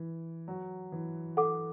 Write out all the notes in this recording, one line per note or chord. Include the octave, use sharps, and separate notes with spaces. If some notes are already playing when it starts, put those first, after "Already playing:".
Already playing: E3 B4
F#3
E3
A4 F#5 D6